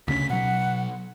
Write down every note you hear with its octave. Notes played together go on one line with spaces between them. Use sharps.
D2 C#3 C#4 B6
B2 F#3 F#5